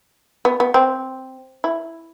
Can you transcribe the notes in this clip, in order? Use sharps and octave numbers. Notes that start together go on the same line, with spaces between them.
B3
B3
C4
E4